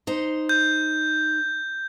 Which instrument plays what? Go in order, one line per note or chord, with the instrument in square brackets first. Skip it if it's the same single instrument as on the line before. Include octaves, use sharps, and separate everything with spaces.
[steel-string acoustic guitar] D#4 C5
[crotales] G6